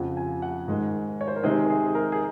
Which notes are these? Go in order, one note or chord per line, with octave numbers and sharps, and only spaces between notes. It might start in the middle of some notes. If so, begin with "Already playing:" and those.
Already playing: F2 C#3 F3 F#5
G#5
F#5
G#2 D#3 G#3
C#5
C5
A#4
C3 D#3 G#3 C4 G#4
G#4
G#4
A#4
G#4